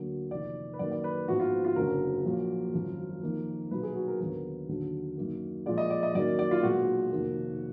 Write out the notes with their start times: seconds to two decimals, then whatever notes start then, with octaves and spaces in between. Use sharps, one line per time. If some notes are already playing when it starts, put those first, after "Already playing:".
Already playing: D2 D3 F#3 A#3
0.31 F1 F2 D#3 A#3 D5
0.73 B4
0.79 F#2 D#3 A#3 D5
0.91 D5
1.04 B4
1.28 A#1 G#2 F3 B3 F#4
1.40 F4
1.65 F4
1.76 F#1 F#2 D3 F#3 A#4
2.25 A#1 A#2 F#3 A#3
2.74 G#1 F#2 F3
3.23 F2 D#3 A#3
3.71 B1 A#2 F#3 B3 B4
3.83 G#4
3.95 F#4
4.08 A#4
4.20 D#2 D3 F#3 B3 A#4
4.69 D#2 D3 F#3
5.17 F#2 D#3 A#3
5.66 A#1 A#2 G#3 D5
5.78 D#5
5.90 D5
6.03 D#5
6.15 F#2 D#3 F#3 A#3 D5
6.39 D5
6.51 F4
6.63 B1 A#2 G#3 B3 F#4
7.12 F1 F2 D#3 A#3